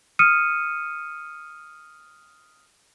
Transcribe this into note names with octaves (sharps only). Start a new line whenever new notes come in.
D#6 F6 C#7 D#7